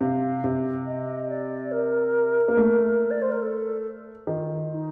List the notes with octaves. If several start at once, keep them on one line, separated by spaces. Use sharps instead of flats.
C3 F5
C3
D#5
D5
A#4
A#3
A3
D5
C5
A#4
A4
D#3 F4
F4
D#4